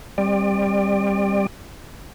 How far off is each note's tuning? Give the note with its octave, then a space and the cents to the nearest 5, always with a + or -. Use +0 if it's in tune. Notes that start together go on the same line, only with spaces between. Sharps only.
G3 +15 C4 +25 D5 +30